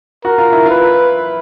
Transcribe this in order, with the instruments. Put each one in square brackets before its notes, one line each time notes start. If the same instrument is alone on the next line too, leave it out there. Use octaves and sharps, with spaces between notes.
[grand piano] F#4 [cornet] A#4
[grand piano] F4
E4
[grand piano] F4 [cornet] B4